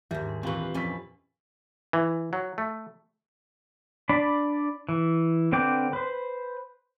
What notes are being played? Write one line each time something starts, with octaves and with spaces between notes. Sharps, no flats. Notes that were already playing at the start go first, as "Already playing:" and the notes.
D#2 G#2 G3 E5
C6
A#2 E3 C4 F4 G4 B4 F5 C6
F2 C#4 E4 D5 B6
E3
F#3
A3
D4 D5 B5
E3
D3 C4 B4 G5 D6
B4 C5